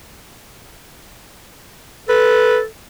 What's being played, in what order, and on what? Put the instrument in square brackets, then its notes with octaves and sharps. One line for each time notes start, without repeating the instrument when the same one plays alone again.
[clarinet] A4 [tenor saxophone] B4